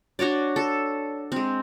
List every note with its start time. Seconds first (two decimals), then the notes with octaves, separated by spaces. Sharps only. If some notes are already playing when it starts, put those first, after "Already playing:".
0.19 D4 F#4 C#5 D5
0.56 A4
1.32 G#3 C4